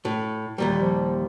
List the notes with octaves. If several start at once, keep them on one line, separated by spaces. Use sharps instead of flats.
A2
D#2 A#2 G3
F3